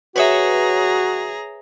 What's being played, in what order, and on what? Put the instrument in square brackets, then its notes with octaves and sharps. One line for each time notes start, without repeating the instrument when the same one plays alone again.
[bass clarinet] F#4 [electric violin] G#4 A#5 [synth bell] B4 C#5 E5